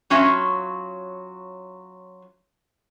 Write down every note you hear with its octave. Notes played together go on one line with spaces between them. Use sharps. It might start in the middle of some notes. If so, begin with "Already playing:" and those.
F#3 C#4 F4 E5